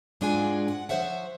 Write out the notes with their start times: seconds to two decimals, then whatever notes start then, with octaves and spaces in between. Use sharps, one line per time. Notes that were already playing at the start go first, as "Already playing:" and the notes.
0.21 G#2 G#3 D4 F4 F#4 G#5
0.68 F#5
0.89 F3 C5 C#5 E5 F#5